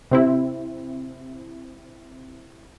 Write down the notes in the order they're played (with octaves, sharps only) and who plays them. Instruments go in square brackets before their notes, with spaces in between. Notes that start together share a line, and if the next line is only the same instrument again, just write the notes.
[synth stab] C3 C4 E4